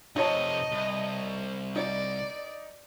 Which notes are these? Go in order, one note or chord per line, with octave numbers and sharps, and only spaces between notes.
F2 C3 D#4 C#5 D#5 A5
C2
D#4 D5